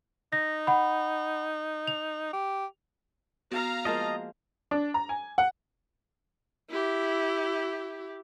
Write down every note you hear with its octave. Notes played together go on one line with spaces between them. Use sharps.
D#4 A#6
F#5 B5
F7
G4
B3 F#4 F5 A#5
F3 G#3 A#3 D#5 A5
D4
A#5
G#5
F#5
E4 G4